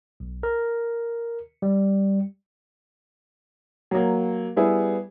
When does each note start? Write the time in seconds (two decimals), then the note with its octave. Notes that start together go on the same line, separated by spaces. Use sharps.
0.20 B1
0.43 A#4
1.62 G3
3.91 F#3 A#3
4.56 G3 B3 E4 G#4